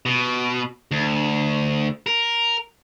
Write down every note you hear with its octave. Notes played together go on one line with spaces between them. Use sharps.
B2
D2
A#4